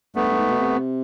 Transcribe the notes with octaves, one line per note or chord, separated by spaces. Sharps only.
G2 A3 B3
G2
G#2
B2
C3